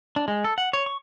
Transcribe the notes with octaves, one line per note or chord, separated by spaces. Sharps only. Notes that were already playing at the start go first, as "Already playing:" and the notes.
D4
G#3
A4
F#5
C#5
C#6